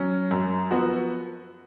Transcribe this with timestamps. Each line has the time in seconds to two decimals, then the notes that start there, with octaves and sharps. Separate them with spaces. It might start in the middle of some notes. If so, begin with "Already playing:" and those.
Already playing: F#3 C#4
0.31 F#2
0.71 F3 B3 F#4